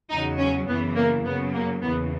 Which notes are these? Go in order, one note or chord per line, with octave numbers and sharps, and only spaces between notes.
E2 C#3 F#3 D#4
C#4
F#2 C#3 E3 B3
A#3
F#2 C#3 F#3 B3
A#3
E2 C#3 E3 B3